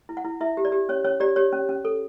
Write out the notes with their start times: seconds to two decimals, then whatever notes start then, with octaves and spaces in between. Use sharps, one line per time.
0.09 E4
0.17 F#5
0.25 E4
0.41 E4 E5
0.57 G4
0.65 D5
0.72 G4
0.89 C#4 C#5
1.05 C#4 C#5
1.20 G4 D5
1.36 G4 C#5
1.53 C#4
1.69 C#4
1.85 A4